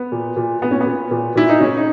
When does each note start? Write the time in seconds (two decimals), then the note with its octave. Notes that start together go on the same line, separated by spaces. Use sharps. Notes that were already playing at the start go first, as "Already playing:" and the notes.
Already playing: B3
0.12 A#2
0.37 A#2
0.62 A#2 B3
0.71 C#4
0.81 B3
0.86 A#2
1.11 A#2
1.35 A#2 E4
1.49 D#4
1.60 C#3 C#4
1.77 D#4